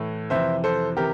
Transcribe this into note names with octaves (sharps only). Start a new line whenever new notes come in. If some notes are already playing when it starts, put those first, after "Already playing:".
Already playing: A2 E3 A3
F2 C3 E3 C5 E5
A4 C5
C3 E3 G4 A#4